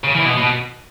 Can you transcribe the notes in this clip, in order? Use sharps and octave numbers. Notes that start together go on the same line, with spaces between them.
C#3
E3
B2
B2